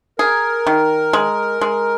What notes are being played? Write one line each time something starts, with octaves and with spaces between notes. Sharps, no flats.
G#4 A#4
D#3
G#3
G#3